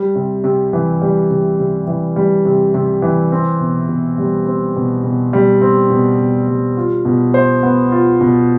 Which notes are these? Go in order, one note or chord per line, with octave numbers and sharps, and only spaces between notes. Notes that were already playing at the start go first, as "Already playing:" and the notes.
Already playing: G3
C3
C3
E3
G3
C3
C3
E3
G3
C3
C3
E3
C4
B2
B2
G3
C4
B2
B2
G3
C4
B2
B2
G3
F4
B2
C5
B3
F4
B2